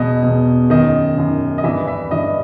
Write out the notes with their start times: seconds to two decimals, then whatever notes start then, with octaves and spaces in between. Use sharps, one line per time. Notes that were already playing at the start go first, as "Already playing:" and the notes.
Already playing: E2 B2 D#5
0.23 E2 B2
0.70 F#2 D#3 D#5
1.17 F#2 D#3
1.58 D#5
1.64 G2 E3 E5
1.87 E5
2.11 G2 E3 D#5